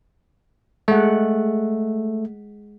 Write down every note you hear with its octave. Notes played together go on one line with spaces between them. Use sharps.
G#3 A3 F#5